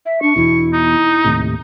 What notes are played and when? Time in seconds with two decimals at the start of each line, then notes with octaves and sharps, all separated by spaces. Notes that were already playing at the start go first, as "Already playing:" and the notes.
0.06 E5
0.22 D4 C#6
0.36 E2 B2 E4
0.73 D#4
1.24 D#2 A2 C3